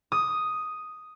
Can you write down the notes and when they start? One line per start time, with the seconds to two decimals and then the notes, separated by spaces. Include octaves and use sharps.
0.12 D#6